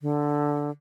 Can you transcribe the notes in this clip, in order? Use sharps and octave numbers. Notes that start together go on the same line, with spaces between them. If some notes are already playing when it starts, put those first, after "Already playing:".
D3